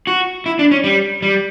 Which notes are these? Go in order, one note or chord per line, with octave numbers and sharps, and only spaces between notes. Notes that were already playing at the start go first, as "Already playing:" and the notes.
F#4
E4
D4
C#4
G3
G3